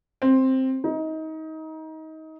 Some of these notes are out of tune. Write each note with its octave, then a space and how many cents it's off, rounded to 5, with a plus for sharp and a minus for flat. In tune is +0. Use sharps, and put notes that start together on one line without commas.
C4 +5
D#4 +25